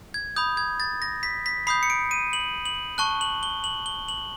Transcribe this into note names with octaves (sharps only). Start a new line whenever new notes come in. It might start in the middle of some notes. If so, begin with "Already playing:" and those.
G#6
B5 D#6 G6
G#6
A6
A#6
B6
B6
B5 D#6 G6 C7
C#7
D7
D#7
F#7
F#7
A5 C#6 F#6 G7
F#7
G7
F#7
G7
F#7